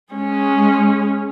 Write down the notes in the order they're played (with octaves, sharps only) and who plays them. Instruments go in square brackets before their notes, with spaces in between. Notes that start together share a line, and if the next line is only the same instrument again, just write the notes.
[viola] G#3 C#4